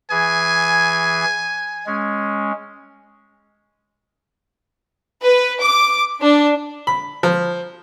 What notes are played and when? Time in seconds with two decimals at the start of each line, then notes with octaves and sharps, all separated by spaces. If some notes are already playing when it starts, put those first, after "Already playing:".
0.11 E3 G#4 G#5 G#6
1.86 G#3 C#4
5.23 B4
5.61 D6
6.21 D4
6.87 B5
7.23 F3